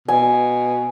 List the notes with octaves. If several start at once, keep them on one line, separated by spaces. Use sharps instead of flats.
B2 G#5